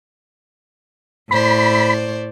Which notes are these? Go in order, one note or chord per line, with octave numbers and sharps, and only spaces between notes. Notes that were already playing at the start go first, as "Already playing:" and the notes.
A2 C5 D5 B5